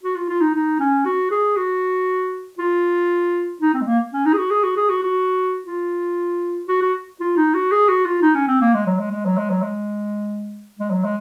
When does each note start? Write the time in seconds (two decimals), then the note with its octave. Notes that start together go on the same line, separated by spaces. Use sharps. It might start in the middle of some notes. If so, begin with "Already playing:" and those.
0.03 F#4
0.16 F4
0.29 F4
0.41 D#4
0.55 D#4
0.80 C#4
1.05 F#4
1.31 G#4
1.57 F#4
2.59 F4
3.61 D#4
3.74 C4
3.81 G#3
3.87 A#3
4.13 C#4
4.26 D#4
4.34 G#4
4.38 F#4
4.51 G#4
4.63 F#4
4.77 G#4
4.90 F#4
5.03 F#4
5.66 F4
6.68 F#4
6.82 F#4
7.20 F4
7.37 D#4
7.55 F#4
7.72 G#4
7.89 F#4
8.05 F4
8.22 D#4
8.35 C#4
8.48 C4
8.61 A#3
8.74 G#3
8.87 F#3
8.99 G#3
9.11 G#3
9.25 F#3
9.37 G#3
9.50 F#3
9.62 G#3
10.79 G#3
10.91 F#3
11.04 G#3